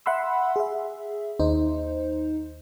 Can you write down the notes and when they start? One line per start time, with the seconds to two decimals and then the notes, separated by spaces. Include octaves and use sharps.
0.06 E5 F#5 B5 C6 E6
0.56 G#4 E5
1.40 D#2 D#4 C5